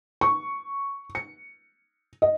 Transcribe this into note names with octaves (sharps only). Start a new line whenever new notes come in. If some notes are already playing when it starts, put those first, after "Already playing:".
C#6
C#7
D#5